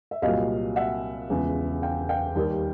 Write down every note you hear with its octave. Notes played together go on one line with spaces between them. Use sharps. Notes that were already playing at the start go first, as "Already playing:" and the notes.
E5
C2 A#2 F#3 D#5 F5
E5 F#5
E1 E2 C#3 F3
F5 G5
F5 G5
D#2 D#3 G3